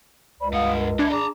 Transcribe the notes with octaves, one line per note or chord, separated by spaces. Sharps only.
C#2 C5 D5 B5
G2 F5 F#5 D#6
A#4
D4 E4 D#5 E5 G#5 G#6
G#4 A5 A#5 D6